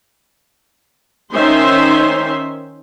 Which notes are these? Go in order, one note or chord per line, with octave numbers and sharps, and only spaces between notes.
D#3 C#4 D#4 C5 E5 C6